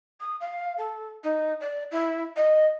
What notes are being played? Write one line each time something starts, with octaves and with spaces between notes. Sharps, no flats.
D#6
F5
A4
D#4
D5
E4
D#5